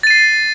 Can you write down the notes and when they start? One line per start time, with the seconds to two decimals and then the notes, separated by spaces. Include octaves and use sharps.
0.03 A6
0.07 D#7
0.10 C7